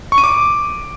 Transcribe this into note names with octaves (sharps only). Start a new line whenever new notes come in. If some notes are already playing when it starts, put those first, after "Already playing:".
C#6
D#7
D6